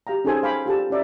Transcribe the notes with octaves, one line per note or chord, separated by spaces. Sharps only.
G4 F5 G5 A#5
C#4 D#4 G#4 A4 C5 G#5
C5 F5 G5 G#5 B5 D6
F4 G4 A4 A5
C#4 E4 D5 E5 A#5